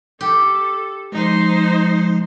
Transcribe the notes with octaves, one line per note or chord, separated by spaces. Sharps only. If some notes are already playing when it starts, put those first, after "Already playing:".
G4 A4
F3 G#3 D#4 C5